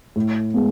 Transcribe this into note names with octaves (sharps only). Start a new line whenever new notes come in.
A2
G#3 B3